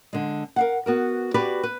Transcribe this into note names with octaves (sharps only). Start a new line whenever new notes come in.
D3 G#3
A#4 F5 F#5
B3 F#4 A#4
F#4 G4 B4 D5
B4